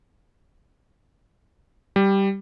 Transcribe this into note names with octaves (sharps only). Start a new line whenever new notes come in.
G3